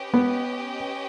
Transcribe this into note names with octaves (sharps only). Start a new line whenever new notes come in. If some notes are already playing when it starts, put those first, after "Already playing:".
Already playing: C#4 G4 B4 D#5 G5
B3